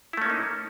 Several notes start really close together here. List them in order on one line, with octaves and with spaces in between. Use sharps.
E4 A3 C#4 A#3 D#4